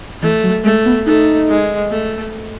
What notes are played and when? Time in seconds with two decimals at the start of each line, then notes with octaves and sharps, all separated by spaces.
0.22 E3 A3
0.43 F#3
0.64 G#3 A3
0.85 B3
1.06 A3 D#4
1.48 G#3
1.90 A3